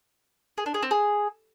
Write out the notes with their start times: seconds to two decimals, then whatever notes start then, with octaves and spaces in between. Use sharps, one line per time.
0.58 G#4
0.66 D4
0.74 G#4
0.83 C4
0.91 G#4